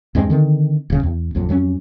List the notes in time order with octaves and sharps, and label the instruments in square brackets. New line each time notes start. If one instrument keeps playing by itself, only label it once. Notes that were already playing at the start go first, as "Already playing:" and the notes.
[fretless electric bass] E2 G2 G#3 C4
D3 D#3 C4
D#1 C#3
E2
A#1 F2 F#3
F2 F#3 A3 C#4